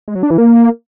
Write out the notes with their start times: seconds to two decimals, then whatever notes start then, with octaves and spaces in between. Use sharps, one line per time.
0.08 G#3
0.15 F#3
0.23 D4
0.30 E3
0.38 A#3